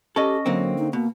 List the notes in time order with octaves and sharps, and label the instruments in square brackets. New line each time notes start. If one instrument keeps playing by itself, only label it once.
[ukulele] C#4 D#5 [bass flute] G4 [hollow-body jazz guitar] A4
[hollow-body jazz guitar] D3 A#3 C4 [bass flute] F#3
[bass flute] D#4
[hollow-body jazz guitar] B2 [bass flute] A#3